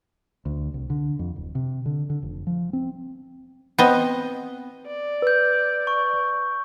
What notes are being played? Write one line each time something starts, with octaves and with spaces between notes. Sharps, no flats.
D2
C2
D3
F2
D1
C3
D3
D3
F1
F3
C4
B3 C4 D#5
D5
B4 E6 G6
C#6